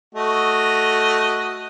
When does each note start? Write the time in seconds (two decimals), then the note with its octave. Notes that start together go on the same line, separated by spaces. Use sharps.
0.15 A3 F#4 D#5